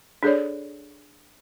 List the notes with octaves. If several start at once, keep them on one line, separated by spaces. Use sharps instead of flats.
D4 G#4 A4 C#5 D5